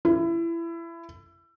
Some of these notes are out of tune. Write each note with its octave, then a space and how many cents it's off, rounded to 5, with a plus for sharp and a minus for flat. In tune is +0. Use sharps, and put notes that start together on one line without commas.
E4 +25